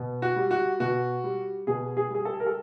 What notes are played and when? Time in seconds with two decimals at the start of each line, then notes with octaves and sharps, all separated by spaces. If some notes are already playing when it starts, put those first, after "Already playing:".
Already playing: B2
0.22 F#4
0.36 G3
0.51 F#4
0.80 B2 F#4
1.24 G3
1.67 B2 G#4
1.97 G#4
2.10 G3 G#4
2.25 A4
2.40 A#4
2.46 A4